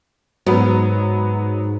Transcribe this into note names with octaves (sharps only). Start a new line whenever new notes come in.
G#2 F#3 B3